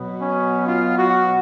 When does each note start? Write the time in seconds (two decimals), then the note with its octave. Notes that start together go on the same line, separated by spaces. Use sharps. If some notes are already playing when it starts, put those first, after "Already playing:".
Already playing: B2 F#3 B3
0.21 C#4
0.67 F4
0.98 F#4